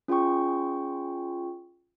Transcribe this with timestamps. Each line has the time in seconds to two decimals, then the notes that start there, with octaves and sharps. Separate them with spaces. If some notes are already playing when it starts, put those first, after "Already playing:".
0.08 C#4 F4 G#4 G5 C#6